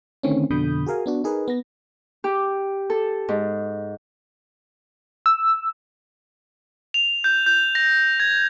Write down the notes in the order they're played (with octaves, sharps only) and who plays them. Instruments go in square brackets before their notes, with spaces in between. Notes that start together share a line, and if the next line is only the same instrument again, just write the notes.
[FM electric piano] D3 D#3 A3 C4 C#4
F2 B2 D3 B5 D#6 G6
F#4 G#4 A#4 F5 G#5
B3 D4 F#4
D#4 G#4 A#4 B4
B3 A#6
[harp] G4
A4
G#2
[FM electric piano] E6
[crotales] F7
G6
G6
A#6
G#6